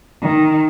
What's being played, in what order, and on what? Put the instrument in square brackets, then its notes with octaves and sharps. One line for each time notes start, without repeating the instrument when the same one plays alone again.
[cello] D#3